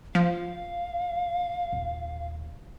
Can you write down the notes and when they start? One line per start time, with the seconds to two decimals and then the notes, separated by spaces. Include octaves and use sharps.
0.15 F3 F5
1.72 D#1